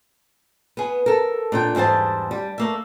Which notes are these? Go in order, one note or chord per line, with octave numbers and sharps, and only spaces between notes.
B3 G#4
A4 A#4
A#2 D4 G5
E2 G#2 G3 C5 A5
G3
A3 A#3 E5